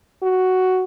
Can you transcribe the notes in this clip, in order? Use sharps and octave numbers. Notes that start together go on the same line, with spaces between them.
F#4